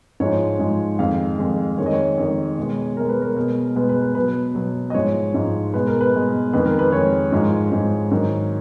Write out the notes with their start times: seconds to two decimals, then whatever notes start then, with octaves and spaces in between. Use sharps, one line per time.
0.20 G#2 F3 G#3 C#5
0.59 G#2 F3 G#3
0.99 F2 D#3 G#3 F5
1.38 F2 D#3 G#3
1.78 F2 D#3 G#3 C#5
1.86 D#5
1.93 C#5
2.18 F2 D#3 G#3
2.58 B2 G#3
2.97 B2 G#3 A#4
3.09 B4
3.22 A#4
3.36 B2 G#3
3.76 B2 G#3 B4
3.89 B4
4.02 B4
4.15 B2 F#3 B4
4.55 B2 F#3
4.90 D#5
4.94 G#2 F3 G#3 C#5
5.34 G#2 F3 G#3
5.74 B2 G#3 B4
5.87 A#4
6.01 B4
6.14 B2 G#3
6.53 F2 D#3 G#3 B4
6.66 A#4
6.79 B4
6.92 F2 D#3 G#3 C#5
7.32 G#2 F3 G#3
7.72 G#2 F3 G#3
8.11 G#2 D#3 F#3